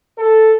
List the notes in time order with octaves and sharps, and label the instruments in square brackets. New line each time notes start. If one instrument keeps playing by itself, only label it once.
[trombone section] A4